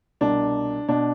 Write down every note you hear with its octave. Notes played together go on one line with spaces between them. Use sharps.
C2 B2 D4
B2 D4